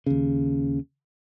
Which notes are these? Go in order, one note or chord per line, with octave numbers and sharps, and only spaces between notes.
D#2 C#3